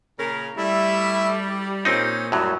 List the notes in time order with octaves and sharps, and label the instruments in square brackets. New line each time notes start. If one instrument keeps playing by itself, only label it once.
[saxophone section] A#2 C#3 A#4
[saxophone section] G3 [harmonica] A3 E4
[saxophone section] A#2 [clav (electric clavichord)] C4 D#4 [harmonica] C#4
[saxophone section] F#2 G3 [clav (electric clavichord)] A2 F#3